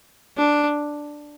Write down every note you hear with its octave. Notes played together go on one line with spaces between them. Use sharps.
D4